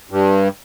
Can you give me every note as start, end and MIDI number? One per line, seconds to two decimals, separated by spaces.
0.11 0.48 43